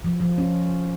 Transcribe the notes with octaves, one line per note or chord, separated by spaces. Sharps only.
F3
F3
C#4